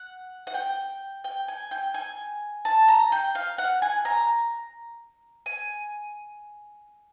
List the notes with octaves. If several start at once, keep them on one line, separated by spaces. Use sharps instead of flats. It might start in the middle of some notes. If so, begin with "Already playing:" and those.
Already playing: F#5
F#5
G5
G5
G#5
G5
G#5
A5
A#5
G5
F5
F#5
G#5
A#5
G#5